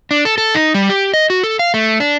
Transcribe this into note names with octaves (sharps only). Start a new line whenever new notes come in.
D4
A4
A4
D#4
G3
G4
D#5
F#4
A4
F5
A3
D4